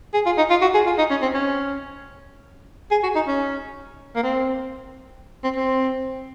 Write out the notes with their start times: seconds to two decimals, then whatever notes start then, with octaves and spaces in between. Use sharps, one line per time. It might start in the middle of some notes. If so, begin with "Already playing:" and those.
0.14 G#4
0.26 F4
0.38 D#4
0.50 F4
0.62 F#4
0.74 G#4
0.86 F4
0.98 D#4
1.10 C#4
1.22 C4
1.34 C#4
2.91 G#4
3.03 F#4
3.15 D#4
3.27 C#4
4.16 A#3
4.23 C4
5.44 C4
5.56 C4